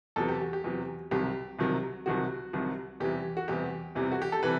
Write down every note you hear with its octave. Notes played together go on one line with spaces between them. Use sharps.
E2 C3 F#3 A4
G4
F#4
G4
E2 C3 F#3
C2 C3 D#3 F#3 G4
C2 C3 D#3 F#3
C2 C3 D#3 F#3 F#4
C2 C3 D#3 F#3
E2 C3 E3 G3 G4
F#4
E2 C3 E3 G3 G4
E2 C3 E3 G3
F#4
G4
A4
C3 E3 G3 B4